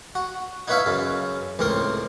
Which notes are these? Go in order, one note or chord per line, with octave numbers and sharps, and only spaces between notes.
F#4
D#4 E4 B4 C#5 E5 F5
F#2 C#3
C#2 A2 C4 A#4 C6